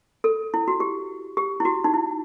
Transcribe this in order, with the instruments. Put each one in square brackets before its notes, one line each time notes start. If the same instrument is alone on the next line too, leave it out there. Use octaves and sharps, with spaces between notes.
[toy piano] A4
E4
F#4
G4
G4
E4
F#4
D#4
E4